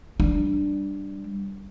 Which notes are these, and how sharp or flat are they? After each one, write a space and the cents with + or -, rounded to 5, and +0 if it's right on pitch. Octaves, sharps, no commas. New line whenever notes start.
G3 +0 D4 +0